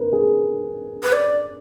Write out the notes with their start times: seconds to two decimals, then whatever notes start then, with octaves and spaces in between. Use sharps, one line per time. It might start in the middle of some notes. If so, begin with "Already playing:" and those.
Already playing: A#4 B4
0.13 G#4
1.03 B4
1.13 D5